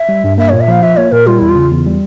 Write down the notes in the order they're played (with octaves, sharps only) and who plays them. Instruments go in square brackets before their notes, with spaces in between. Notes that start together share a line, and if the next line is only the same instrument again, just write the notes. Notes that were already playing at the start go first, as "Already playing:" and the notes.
Already playing: [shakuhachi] E5
[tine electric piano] G3
G2
[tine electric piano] A#3 [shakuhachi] E5
[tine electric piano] A#2 [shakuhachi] C#5
[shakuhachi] E5
[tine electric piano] F3 [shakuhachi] F5
[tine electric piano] F4 [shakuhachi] E5
[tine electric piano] A#3 [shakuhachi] C#5
[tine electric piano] A#2 [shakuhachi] A#4
[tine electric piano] G3 [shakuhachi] F4
[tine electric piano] E2 [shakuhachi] E4
[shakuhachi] F4
[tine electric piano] C#3
E2
G3